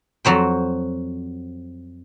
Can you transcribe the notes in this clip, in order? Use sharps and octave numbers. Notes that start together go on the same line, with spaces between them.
F2 F#3 C5 G5